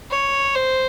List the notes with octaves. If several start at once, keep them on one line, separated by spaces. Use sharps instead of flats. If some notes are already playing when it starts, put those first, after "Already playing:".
C#5
C5